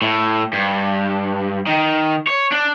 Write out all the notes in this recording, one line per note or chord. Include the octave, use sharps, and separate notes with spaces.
A2
G2
D#3
C#5
D4